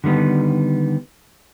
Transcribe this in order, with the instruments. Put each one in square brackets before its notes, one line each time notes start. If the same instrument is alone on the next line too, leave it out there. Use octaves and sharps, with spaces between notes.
[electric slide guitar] D3 D#3 G3 B3